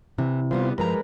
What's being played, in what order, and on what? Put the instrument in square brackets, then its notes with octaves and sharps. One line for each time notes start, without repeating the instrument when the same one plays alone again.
[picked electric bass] C3 [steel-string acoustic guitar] E3
[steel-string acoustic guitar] E3 G3 B3 [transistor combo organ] F4 C5
[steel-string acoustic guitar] G2 F3 A#5 [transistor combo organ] G#3 A#4 B4